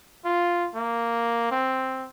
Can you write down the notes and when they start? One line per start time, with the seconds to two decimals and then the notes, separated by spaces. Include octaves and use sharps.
0.25 F4
0.75 A#3
1.51 C4